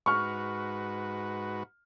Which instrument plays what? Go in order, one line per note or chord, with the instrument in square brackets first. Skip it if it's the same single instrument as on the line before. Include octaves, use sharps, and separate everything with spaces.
[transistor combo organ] G#2 F#4 B4 [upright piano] C#6 F6